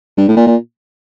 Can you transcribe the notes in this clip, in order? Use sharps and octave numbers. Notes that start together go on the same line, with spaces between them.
G2
A2
A#2
A#2